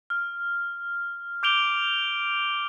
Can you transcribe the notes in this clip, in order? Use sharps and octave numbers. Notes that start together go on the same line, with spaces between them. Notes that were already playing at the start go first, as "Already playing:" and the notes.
F6
D6 G6 D7 F7 G7